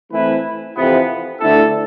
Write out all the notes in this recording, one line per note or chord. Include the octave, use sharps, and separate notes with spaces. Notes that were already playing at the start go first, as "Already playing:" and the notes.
E3 A3 C4 E4 B4
F2 C3 E3 B3
D2 D3 A3 E4 A4